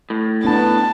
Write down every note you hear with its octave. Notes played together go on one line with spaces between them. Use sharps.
A2
B3 C#4 D4 A5